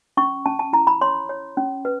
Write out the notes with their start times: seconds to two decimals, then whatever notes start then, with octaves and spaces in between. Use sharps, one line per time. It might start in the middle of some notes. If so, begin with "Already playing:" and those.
0.17 C#4 C#6
0.45 C#4 A5
0.59 A5
0.73 E4 A#5
0.87 B5
1.01 C#5 C6
1.29 C#5
1.57 C#4
1.85 B4